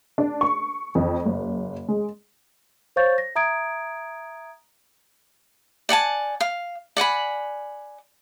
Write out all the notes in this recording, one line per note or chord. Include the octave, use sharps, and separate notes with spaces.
D4
C#6
F2
F#1
G#3
C5 C#5 F5 C#6 G6 A6
A#6
E5 A#5 D#6 G#6 D7
D5 F#5 G#5 A5
F5
D5 F#5 G#5 B5